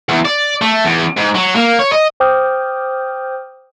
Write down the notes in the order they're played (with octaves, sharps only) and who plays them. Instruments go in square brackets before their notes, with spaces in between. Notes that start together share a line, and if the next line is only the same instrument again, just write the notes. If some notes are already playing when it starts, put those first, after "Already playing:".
[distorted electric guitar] E2
D5
A3
E2
G#2
F#3
A#3
C#5
D#5
[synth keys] C5 G5 D6 D#6 F6 G6